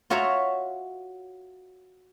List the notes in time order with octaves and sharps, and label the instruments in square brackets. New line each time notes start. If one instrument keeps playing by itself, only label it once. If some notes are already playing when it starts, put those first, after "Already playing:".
[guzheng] F4 F#4 C#5 E5 F#5 A#5